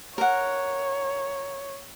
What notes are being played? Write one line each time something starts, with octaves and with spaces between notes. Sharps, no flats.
A#4 C#5 F#5